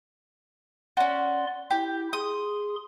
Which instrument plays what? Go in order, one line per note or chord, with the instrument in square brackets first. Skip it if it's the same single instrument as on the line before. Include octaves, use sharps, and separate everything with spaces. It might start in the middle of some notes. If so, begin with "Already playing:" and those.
[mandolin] C#4 F#4 [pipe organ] D5 C6
[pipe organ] E4 [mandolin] G4
[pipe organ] G#4 C6 [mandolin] D#6